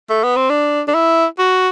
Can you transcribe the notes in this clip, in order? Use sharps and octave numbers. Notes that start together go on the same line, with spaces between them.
A3
B3
C4
D4
D4
E4
F#4